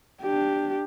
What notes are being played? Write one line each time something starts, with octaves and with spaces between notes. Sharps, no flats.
D4 G4